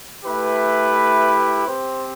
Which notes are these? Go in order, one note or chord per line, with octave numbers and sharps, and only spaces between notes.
A3 E4 G4 B4
C4 G4 C5